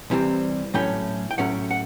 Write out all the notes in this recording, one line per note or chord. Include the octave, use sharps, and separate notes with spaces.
C2 C3 E3 G3 C4
A2 F#3 A3 C#4 G5
G5
A2 F#3 A3 C#4 F#5
F#5